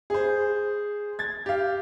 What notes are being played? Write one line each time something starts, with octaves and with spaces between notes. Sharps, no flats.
G#4 C5
G#6 A6
G4 F5